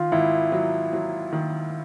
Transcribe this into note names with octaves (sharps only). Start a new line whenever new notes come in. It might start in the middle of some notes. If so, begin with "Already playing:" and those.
Already playing: D#3 F4
G#1 E4
F#3
F#3
D#3